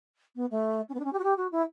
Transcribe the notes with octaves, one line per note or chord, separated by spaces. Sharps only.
B3
A3
C#4
B3
D4
C#4
G4
F#4
G4
F#4
E4